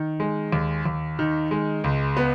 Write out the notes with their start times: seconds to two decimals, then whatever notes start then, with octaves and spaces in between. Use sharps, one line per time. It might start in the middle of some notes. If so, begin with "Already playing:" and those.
Already playing: D#3
0.20 G#3
0.52 D#2
0.85 D#2
1.19 D#3
1.51 G#3
1.84 C#2
2.17 B3